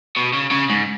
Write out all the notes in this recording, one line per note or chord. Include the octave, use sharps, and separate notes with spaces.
B2
C#3
C#3
G#2